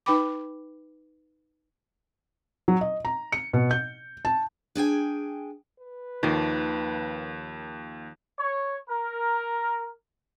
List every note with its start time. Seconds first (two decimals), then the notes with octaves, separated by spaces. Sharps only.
0.06 D#4 B4 G5 B5 D6
2.68 F#3
2.81 D#5
3.05 A#5
3.32 C#7
3.53 B2
3.71 G6
4.25 A5
4.75 D4 G#4 G5 G#5
5.80 B4
6.23 D#2 D#3 F3 A#3
8.39 C#5
8.89 A#4